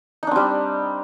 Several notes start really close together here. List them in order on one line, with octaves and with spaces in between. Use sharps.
D#4 D4 C4 G3